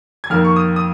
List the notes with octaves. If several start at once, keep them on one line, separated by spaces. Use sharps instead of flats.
G#6
F2 D#3 A#3 F6
C#6
D#6
D#6